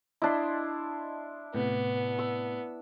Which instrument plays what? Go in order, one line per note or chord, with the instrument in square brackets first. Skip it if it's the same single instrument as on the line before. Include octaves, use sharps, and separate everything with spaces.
[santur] D4 E4 [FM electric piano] D#5 A5 C6
[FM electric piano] A2 C3 [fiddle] B3
[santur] E6